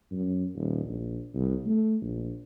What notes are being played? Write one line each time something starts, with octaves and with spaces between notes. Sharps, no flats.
F#2
D#1
A#1
C2
A3
A#1